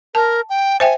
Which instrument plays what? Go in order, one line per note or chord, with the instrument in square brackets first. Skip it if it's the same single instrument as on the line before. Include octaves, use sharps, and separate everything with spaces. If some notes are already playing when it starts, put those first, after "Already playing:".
[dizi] A#4 [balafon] A5
[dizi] G5
[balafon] C5 E5 G5 [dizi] G#5